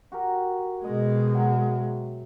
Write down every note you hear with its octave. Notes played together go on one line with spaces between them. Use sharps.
F#4 G4 A#4
B2 G#3 D#5
F#3 E5 G5